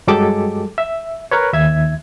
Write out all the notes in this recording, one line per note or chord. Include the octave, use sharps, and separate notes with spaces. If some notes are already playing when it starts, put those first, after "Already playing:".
G2 F#3 G#3 G4 A4 D6
E5
A#4 B4 C#5
D#2 E5 G#6